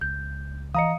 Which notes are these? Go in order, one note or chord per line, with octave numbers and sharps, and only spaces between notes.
C#2 G6
E3 D#5 F5 A#5 D#6 C#7